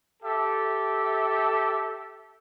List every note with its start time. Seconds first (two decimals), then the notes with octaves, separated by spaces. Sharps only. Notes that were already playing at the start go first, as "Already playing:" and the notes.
0.23 G4 A4 E5